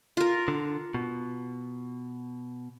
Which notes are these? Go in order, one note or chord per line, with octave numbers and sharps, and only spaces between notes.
F4 A#4
D3
B2